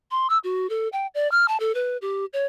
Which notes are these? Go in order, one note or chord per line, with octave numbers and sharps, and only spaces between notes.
C6
E6
F#4
A4
G5
D5
F6
A5
A4
B4
G4
C#5